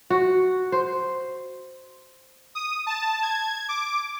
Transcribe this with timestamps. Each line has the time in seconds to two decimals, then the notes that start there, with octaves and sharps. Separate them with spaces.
0.10 F#4
0.72 C5
2.55 D#6
2.87 A5
3.23 G#6
3.68 D6